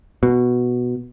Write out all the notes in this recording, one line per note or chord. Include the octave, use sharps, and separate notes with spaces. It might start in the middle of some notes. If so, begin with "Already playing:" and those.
B2